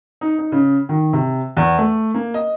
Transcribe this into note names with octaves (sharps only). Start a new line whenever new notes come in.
D#4
D#4
C#3
D#3
C3
E2
A3
A#3
D#5